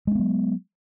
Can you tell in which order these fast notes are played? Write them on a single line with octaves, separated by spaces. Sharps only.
G#3 C#4 B3 F#3